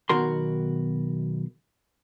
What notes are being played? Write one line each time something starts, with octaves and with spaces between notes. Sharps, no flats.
B1 B2 D#3 F#4 A#4 C6